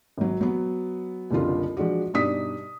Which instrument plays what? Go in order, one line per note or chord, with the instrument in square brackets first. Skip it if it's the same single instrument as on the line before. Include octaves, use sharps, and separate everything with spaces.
[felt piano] G#1 F#3
F#3 B3
F#1 C2 D3 F4
F3 G#3 D4 F#4
G2 B2 D4 D#4 D#6 B6